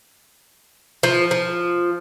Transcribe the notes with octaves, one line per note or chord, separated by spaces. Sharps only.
F3
F3